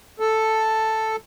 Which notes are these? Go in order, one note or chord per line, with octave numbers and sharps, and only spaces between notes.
A4